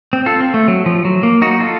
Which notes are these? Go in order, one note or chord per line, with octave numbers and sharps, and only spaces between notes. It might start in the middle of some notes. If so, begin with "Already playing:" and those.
C4
F4 A4
C4
A3
F#3
F3
F#3
A#3
D#4 F#4
F4 A4